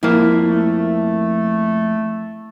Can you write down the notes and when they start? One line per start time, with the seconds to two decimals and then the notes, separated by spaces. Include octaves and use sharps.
0.03 F2 A#3 E4
0.46 A3